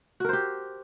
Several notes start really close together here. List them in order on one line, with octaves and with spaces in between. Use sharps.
F#4 A#4 C5 G4